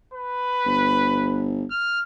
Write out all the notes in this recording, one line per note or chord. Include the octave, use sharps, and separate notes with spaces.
B4
G1
F6